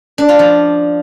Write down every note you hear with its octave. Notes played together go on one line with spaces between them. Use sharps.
D4
F4
F3